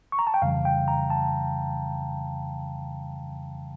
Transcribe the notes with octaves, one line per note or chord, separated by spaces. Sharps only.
C#6
A#5
A5
G5
F2 C#3 E3 G3 F5
G5
A#5
A5